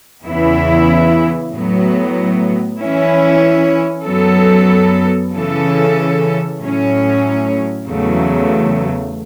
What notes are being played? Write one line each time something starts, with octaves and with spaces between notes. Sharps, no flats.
E2 C#3 E3 B3 E4
A2 F#3 B3
E3 C#4 E4
F#2 F#3 B3 A4
C#3 E3 C#4 A4
A2 F#3 C#4
E2 C#3 F#3 A3